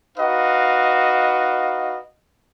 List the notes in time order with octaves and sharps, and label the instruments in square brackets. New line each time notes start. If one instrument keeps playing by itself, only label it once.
[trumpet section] D#4 F#4 B4 D#5 F5